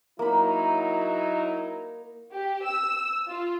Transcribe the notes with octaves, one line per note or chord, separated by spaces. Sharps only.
F#3 A#3 D#4 E4 B5
G4
E6
F4